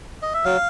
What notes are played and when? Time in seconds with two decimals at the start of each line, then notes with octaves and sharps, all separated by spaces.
0.22 D#5
0.34 E5
0.45 F#3 F5